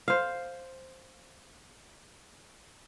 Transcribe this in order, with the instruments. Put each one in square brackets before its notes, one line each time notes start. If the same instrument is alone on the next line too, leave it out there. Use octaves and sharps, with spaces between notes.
[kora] C5 F5